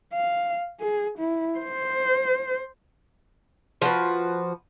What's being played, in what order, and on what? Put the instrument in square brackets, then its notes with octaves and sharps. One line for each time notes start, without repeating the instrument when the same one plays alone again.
[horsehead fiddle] F5
G#4
E4
C5
[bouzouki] F3 F#4 B4